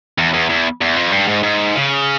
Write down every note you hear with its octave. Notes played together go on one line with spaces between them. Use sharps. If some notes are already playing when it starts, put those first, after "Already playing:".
E2
E2
E2
E2
F2
G2
G#2
G#2
C#3